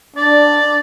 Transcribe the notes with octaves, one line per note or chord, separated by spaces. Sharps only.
D4 D5